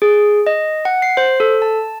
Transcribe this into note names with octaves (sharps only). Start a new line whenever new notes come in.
G#4
D#5
F#5
C7
C5
A4
A5